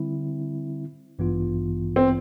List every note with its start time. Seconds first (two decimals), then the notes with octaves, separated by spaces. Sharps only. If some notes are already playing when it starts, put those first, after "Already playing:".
Already playing: D3 G3 C4 E4
1.19 A1 G2 E3 B3 F4
1.96 C4